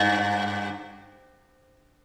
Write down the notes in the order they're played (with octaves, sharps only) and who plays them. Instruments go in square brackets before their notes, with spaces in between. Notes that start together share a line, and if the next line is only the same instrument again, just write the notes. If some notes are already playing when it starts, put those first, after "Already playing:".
Already playing: [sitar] G2